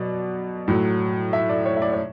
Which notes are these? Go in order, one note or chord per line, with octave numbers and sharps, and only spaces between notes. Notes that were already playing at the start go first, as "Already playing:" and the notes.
Already playing: B2 F#3 D5
A2 F#3
E5
D5
C#5
E5
D5
C#5